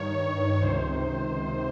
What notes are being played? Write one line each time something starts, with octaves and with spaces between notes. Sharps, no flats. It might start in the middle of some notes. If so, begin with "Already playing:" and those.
Already playing: G2 D#3 C#5
C#2 C3 D#3 C5